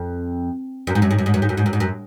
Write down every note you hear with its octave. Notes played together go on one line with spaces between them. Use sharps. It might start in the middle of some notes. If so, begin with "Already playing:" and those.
Already playing: F2
F#2
G#2
F#2
G#2
F#2
G#2
F#2
G#2
F#2
G#2
F#2
G#2
F#2